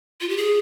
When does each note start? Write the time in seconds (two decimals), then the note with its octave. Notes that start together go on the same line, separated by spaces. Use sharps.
0.21 F4
0.29 G4
0.37 G#4